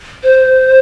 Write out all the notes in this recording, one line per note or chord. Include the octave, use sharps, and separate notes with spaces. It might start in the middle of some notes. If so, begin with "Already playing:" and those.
C5